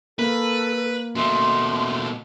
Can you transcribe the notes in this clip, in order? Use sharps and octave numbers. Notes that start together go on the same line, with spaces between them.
A#3 A4 B4
B2 A3 C6